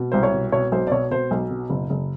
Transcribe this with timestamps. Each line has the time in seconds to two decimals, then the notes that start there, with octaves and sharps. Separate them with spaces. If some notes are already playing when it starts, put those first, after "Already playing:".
Already playing: B2
0.12 C2 C5
0.23 C#5
0.33 B2
0.52 B2 C#5
0.72 B1 C5
0.87 D5
0.91 B2 C#5
1.11 B2 C5
1.31 B1
1.50 B2
1.70 F#1
1.90 F#1